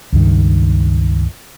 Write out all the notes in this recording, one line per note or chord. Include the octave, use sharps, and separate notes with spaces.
C#2 G2 D#3